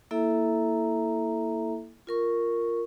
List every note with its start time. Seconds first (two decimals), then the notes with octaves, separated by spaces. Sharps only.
0.11 A#3 E4 A4 E5 A#5
2.07 F4 A#4 C#6